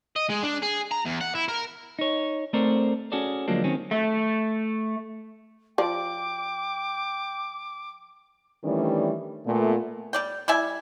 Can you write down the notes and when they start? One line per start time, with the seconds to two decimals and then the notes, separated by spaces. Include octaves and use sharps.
0.16 D#5
0.30 G#3
0.44 D4
0.63 G#4
0.91 A#5
1.05 E2
1.21 F#5
1.35 E4
1.48 A#4
1.99 D#4 C#5
2.53 A3 C4 A4 A#4 C5 D5
3.12 C#4 F#4 G#4 A4 D5
3.48 D3 F3 F#3 G#3 A#3 D4
3.64 D#3 F#3 C4 C#4
3.91 A3
5.78 F3 D5 G5 D6
8.64 D#3 E3 G3 A3 C#4 D4
9.46 A#2 A3 B3
10.13 G3 D5 G5
10.48 G3 E4 E5 G#5